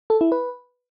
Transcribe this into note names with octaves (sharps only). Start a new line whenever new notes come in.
A4
E4
B4